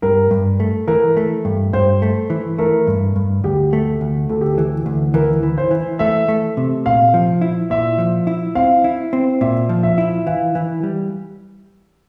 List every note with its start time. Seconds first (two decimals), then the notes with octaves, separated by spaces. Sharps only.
0.02 G2 A#4
0.31 G2
0.60 A3
0.87 E3 A#4
1.17 A3
1.45 G2
1.73 G2 C5
2.02 A3
2.30 E3
2.58 A3 A#4
2.87 G2
3.16 G2
3.44 D2 G4
3.73 A3
4.01 D2
4.29 D2 A4
4.41 G4
4.53 E3 A4
4.86 D2
5.14 E3 A#4
5.43 E3
5.58 C5
5.71 E3
5.99 A3 E5
6.28 A3
6.57 C3
6.86 A#2 F5
7.14 F3
7.41 E4
7.70 A#2 E5
7.98 F3
8.27 E4
8.55 C4 F5
8.84 E4
9.13 C4
9.41 A#2 E5
9.69 F3
9.83 E5
9.98 E4
10.27 E3 F5
10.55 E3
10.83 G3